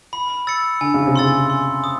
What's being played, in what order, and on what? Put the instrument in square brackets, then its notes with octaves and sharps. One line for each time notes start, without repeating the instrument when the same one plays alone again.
[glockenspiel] B5
E6 A6 C#7
[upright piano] D3 [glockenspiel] G#5
[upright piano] C#3
C3
[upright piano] C#3 [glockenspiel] C6 E6 A6
[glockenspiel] C6
D#6